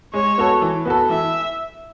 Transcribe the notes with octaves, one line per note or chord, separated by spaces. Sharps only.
G#3 C#5
B3 F#4 A4
E3
B3 F#4 A4
E3 E5